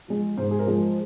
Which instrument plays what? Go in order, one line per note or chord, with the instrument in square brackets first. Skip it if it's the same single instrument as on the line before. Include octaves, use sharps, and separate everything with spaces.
[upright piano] F3 G#3
G#2 C5
G#4
A#4
F3 G#3 C5